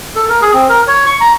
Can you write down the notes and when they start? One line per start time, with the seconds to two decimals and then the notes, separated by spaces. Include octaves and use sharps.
0.15 A4
0.29 A#4
0.42 G#4
0.53 C4
0.69 A#4
0.87 C#5
1.06 C#6
1.21 A#5